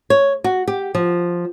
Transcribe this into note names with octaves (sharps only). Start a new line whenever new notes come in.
C#5
F#4
G4
F3